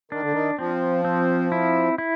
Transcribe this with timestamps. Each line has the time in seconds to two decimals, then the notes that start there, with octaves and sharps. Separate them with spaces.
0.12 D#3 D4
0.22 D3
0.32 D#3
0.58 F3 C4
1.04 C4
1.52 E4
1.98 E4